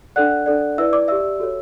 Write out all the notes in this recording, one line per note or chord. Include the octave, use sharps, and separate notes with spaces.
D4 A4 D5 F#5 F#6
D4 A4 D5
E4 B4 D5 E5 E6
D5 D6
G4 D5 E5 E6
F#4 A4 C#5